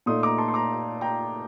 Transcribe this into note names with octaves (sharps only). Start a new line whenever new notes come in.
A#2 A3 D#4 C6 D#6
A#5 D6
A5 C6
C6
A#5 D6
G5 A#5